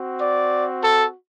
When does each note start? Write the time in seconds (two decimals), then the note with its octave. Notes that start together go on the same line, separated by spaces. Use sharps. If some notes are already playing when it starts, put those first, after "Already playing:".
Already playing: C4 F#4
0.21 D5
0.84 A4